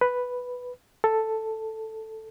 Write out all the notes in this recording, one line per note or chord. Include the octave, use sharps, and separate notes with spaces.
B4
A4